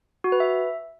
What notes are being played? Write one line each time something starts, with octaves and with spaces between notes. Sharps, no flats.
F#4
B4
E5